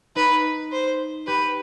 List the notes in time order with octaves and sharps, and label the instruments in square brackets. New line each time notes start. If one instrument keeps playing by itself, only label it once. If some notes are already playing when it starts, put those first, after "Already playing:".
[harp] D#4 [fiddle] B4
[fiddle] C5
[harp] G4 [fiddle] B4